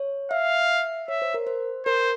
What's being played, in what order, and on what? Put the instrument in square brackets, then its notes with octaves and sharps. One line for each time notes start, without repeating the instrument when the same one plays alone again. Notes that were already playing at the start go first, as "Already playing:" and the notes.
Already playing: [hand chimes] C#5
[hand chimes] E5 [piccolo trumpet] F5
[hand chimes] C#5 [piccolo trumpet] E5
[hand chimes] C5
A#4
C5
[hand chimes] A#4 [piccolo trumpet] C5